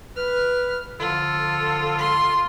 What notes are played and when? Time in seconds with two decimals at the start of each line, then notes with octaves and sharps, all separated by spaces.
0.16 B4 F6
0.99 D3 F3 F4 A4
1.99 C6